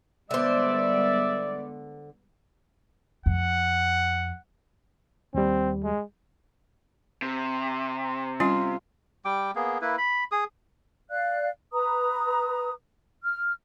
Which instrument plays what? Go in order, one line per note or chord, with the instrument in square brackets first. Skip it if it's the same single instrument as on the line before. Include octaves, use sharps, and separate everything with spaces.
[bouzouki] D3 C5 [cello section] G3 G#3 B3 [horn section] D5 [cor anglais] E5
[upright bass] F2 [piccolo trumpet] F#5
[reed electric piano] D#2 G3 [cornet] C4
[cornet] G#3
[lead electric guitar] C3
[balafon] G3 C#4 [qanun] F4
[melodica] G3 G5 D6
A#3 B3 G#4
A#3 E4 B4
B5
G#4 D#6
[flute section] D5 F5 F#6
B4 A#5 D#6
F6